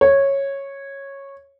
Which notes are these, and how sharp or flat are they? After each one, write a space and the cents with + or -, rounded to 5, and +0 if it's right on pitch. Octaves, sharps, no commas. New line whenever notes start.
C#5 -10